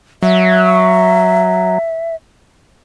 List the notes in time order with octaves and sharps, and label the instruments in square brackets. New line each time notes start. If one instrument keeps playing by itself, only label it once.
[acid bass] F#3 [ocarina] E5